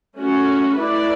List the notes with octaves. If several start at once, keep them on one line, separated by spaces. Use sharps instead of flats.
A3 C#4 F#4
A3 E4 B4 D5